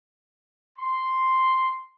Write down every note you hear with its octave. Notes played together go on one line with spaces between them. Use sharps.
C6